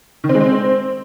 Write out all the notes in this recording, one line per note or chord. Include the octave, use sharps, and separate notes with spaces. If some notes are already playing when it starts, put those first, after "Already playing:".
D#3
C4
G#3
C4